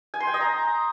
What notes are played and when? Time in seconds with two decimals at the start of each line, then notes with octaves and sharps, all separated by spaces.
0.14 G#5
0.20 C6
0.27 G5
0.34 D#5
0.41 A#5